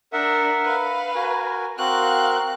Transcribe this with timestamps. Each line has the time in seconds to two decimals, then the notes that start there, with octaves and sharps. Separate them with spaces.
0.13 D4 A#4 E5 F#5
0.64 B4 F5
1.15 F#4 A#4 G#5
1.78 C4 F#4 A#4 F5 F#6